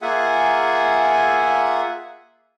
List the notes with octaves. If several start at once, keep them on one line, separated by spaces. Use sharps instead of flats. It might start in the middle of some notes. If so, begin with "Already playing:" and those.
A#3 F4 G#4 E5 F#5 G#5